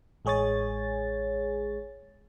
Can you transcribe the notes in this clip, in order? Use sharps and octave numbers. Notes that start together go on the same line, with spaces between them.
A1 G#3 G#4 C#5 G#5 A6